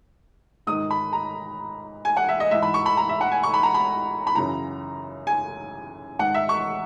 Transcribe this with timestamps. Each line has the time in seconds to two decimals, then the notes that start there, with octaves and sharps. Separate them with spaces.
0.67 G#2 D#3 D#6
0.91 B5
1.13 A#5
2.05 G#5
2.17 F#5
2.29 E5
2.40 D#5
2.51 G#2 E3 E5
2.62 B5
2.74 C#6
2.86 B5
2.97 A#5
3.09 E5
3.21 F#5
3.32 G#5
3.43 C#6
3.54 B5
3.63 A#5
3.74 B5
4.27 B5
4.35 F#2 C#3 E3 A#5
5.27 G#5
6.19 G#2 D#3 F#5
6.34 E5
6.49 C#6